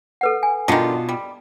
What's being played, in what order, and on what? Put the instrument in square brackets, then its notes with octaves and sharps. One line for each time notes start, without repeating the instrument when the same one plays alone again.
[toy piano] A4 B4 F#5
G#5
[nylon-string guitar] B2 F4 [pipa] D3 D#3
[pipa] G3